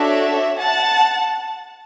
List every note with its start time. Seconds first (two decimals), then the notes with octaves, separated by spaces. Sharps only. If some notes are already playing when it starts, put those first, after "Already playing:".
Already playing: D4 F#4 A4 C#5 E5
0.59 F#5 A5